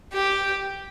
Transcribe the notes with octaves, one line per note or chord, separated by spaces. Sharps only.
G4